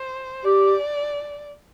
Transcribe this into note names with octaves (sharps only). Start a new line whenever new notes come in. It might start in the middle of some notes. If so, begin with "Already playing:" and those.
Already playing: C5
G4 D5